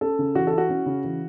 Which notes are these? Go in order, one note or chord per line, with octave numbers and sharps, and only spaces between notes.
C#4 A4
C#3
E3 F#4
A4
E4
F#4
C#4
C#3
E3